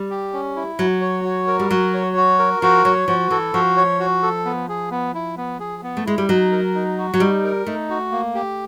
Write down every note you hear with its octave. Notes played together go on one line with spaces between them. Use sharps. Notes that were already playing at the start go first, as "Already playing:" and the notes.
Already playing: G3
G4
C#4
E4
F#3 F#4
C#5
F#4
A#4
G3
F#3 F#4
C#5
F#4
A#4
F3 F#4
F#3 C#5
F3 F#4
E3 A4
F3 F#4
C#5
F#4
A4
B3
G#4
B3
E4
B3
G#4
B3
A3
G#3 E4
G3
F#3 D#4
A#4
D#4
F#4
F#3
G3 D#4
A#4
A3 D#4
F#4
A#3
G4